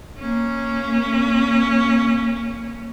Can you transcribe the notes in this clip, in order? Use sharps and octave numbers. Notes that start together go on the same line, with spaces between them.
A#3 C#4